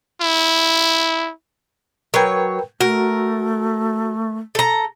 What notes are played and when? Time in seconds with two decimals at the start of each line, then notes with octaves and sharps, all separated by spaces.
0.21 E4
2.14 F#3 A#4 B4 C#5 G5
2.80 A3 F#4 A#4
4.55 A4 A#5